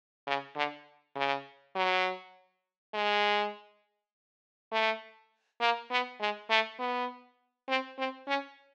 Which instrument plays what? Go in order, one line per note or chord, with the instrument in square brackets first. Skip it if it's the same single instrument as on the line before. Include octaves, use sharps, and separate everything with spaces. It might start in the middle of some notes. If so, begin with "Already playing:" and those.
[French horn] C#3
D3
C#3
F#3
G#3
A3
A#3
B3
G#3
A3
B3
C4
C4
C#4